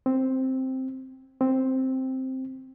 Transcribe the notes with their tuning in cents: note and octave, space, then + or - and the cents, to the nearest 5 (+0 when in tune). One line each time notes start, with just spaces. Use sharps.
C4 +5
C4 +5